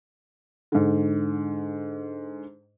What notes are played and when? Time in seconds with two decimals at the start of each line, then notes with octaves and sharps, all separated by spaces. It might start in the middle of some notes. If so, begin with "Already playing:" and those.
0.72 G#2 D3